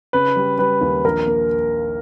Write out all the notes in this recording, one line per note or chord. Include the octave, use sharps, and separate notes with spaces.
C#3 B4
G3
G3 B4
D#2
A#1 A#4
A#3